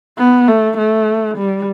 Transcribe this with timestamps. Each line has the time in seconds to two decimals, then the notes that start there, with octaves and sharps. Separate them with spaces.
0.18 B3
0.47 A3
0.78 A3
1.38 G3